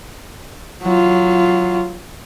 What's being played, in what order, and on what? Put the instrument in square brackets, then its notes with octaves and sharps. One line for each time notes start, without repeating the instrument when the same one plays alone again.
[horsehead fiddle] F#3 F4